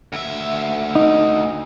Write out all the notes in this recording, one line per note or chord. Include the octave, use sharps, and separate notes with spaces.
D2 E5
D#4